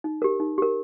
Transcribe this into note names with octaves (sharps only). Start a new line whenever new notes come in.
D#4
G4 A#4
D#4
G4 A#4